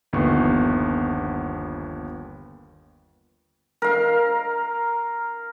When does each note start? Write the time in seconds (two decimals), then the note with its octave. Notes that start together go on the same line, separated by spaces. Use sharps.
0.13 G1 D#2 F3 B3 C#6
3.82 A#4 F5